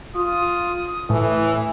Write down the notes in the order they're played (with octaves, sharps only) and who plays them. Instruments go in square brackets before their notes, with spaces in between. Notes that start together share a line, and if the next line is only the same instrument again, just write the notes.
[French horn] F4 [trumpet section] D#6
[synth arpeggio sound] A2 [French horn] E3